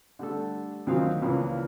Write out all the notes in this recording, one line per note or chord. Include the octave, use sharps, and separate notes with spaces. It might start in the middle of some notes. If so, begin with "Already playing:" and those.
D3 G3 A3 A4
D2 D#3 F3 F#3 C4 F5
C#2 A#2 E3 F3 A#3